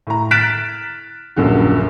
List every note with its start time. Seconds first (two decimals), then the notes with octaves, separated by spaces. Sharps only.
0.07 A2 A#5
0.31 F6 F#6 A6 B6 D7 E7
1.36 D#1 A#1 F#2 D3